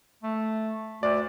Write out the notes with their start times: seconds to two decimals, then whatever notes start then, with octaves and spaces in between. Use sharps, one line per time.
0.23 A3
1.03 D2 D5